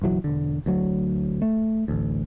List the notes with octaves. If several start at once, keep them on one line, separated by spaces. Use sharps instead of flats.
F#1 B1 E3 F#3
E1 D3
D2 F#3
A3
A1 D2